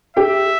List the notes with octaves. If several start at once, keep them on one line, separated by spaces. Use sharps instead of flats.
G4 E5 G5